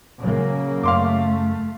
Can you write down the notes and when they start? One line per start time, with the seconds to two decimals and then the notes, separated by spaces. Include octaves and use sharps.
0.19 C#3 F#3 A#3
0.83 F#2 A3 F5 C6 D6